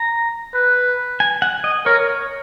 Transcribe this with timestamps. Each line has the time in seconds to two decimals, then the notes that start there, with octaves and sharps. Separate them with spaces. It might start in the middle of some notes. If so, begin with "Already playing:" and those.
Already playing: A#5
0.54 B4
1.20 G#5
1.42 F#5
1.64 D#5
1.86 A#4 C#5